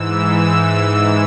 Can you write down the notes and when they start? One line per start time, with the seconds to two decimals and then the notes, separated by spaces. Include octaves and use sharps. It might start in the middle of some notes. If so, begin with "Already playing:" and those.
Already playing: G#2 E3 E6
0.11 E6